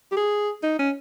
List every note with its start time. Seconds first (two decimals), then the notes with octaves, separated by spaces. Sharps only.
0.12 G4
0.16 G#4
0.63 D#4
0.79 C#4